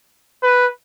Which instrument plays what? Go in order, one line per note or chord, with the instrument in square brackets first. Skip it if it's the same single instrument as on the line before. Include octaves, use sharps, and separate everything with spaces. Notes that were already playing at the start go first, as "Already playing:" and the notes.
[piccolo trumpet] B4